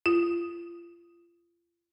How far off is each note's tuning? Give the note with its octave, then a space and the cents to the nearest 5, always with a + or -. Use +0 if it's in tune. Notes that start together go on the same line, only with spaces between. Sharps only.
F4 -30